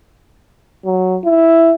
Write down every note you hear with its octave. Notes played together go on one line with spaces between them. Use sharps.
F#3
E4